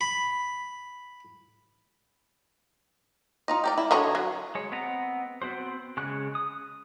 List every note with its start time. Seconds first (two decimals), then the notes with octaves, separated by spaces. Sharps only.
0.01 B5
3.48 D#4 F4 D#5
3.64 G4 A#4 D5
3.78 E4
3.91 D3 F#4 C#5 D#5 A#5
4.15 F#3
4.55 G#3 C#5
4.72 B3 C4 D#5 A#5
5.42 B3 C4 F#4 C5
5.97 C#3 G#3 C#6 F#6
6.35 D#6